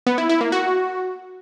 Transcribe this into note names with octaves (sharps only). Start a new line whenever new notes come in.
B3
E4
E4
A#3
F#4